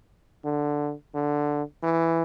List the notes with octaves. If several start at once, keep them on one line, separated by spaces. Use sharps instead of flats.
D3
D3
E3